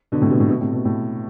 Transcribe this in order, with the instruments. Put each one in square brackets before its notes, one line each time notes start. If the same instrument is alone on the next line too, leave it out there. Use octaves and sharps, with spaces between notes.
[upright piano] B2 D3
A2 C3
B2
A2
B2
A2 C3
B2
A2